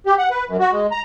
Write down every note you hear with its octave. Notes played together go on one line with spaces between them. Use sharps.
G4
F#5
B4
F#2
F#4
G#3
A#5